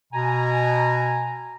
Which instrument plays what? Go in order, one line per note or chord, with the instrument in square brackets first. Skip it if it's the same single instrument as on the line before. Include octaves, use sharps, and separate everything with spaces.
[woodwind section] B2 G#5 A#5